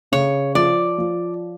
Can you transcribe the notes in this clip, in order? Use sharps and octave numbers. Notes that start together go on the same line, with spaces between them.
C#3 C#5
F3 D5
F3